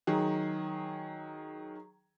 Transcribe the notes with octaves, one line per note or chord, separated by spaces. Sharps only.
D#3 F#3 G#4